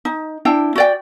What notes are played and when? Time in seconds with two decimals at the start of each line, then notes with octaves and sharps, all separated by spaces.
0.05 D#4
0.45 D4 E4 G5
0.76 F#4 D5 G5